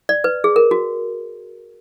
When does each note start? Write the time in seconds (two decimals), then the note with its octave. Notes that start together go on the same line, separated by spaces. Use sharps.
0.09 D5
0.24 B4
0.44 G#4
0.56 A#4
0.71 F#4